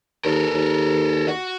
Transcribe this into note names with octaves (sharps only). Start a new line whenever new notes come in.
D#2 A4 A#4
D#2
F#4